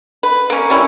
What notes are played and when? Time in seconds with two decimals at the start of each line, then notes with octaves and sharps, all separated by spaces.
0.23 B4
0.50 A#3 C#4
0.70 G3 C#4 E4